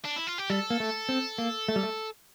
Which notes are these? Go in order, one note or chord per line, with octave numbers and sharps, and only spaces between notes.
D4
E4
F4
G4
G3 A4
A#3
A3
C4
A#3
A3
G3
A3